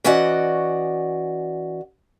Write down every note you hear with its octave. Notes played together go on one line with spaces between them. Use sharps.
E3 C#4 F#4 D5 D#5 F#5